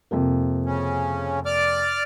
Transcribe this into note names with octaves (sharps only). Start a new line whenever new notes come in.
F2 C3 A#3
C#3 C#4
D5 D6 F6